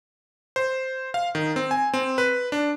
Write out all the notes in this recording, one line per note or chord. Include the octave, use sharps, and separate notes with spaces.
C5
F5
D#3
C4
G#5
C4
B4
D4